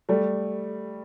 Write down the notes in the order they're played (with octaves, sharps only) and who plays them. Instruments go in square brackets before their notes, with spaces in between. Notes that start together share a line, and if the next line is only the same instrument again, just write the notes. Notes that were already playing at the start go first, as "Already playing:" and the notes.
[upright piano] G3 A3